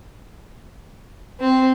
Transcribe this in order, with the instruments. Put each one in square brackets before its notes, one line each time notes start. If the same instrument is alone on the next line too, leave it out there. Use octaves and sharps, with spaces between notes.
[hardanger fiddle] C4